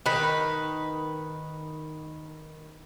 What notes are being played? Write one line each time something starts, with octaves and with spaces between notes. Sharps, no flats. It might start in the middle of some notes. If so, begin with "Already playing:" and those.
D#3 B4